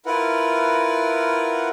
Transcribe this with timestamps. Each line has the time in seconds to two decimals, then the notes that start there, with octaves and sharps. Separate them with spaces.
0.06 E4 F4 A#4 B4 F#5